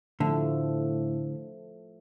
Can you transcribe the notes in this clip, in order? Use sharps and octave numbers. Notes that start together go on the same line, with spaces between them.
A2 D3 F3 A3